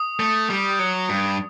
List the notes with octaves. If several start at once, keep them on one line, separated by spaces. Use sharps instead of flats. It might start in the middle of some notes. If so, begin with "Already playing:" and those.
Already playing: D#6
A3
G3
F#3
G2